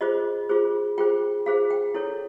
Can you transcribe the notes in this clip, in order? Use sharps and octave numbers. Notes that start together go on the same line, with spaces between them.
F4 G#4 C5 D#5
F4 G#4 C5
F4 G#4 C5 G5
F4 G#4 C5 F5
G5
E4 A4 C#5